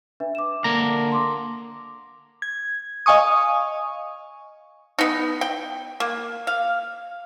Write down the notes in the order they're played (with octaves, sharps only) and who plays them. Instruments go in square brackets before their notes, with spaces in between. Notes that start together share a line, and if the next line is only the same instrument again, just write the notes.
[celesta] D4 B4 E5
D6 E7
[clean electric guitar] D3 A#3 A#5
[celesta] C6 D6
[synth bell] G#6
D#5 F5 G#5 C#6 D#6
[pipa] B3 D#4
G5
A#3
F5